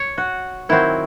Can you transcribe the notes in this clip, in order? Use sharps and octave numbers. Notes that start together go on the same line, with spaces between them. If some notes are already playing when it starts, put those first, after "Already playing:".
Already playing: C#5
F#4
D#3 F#3 C4 E4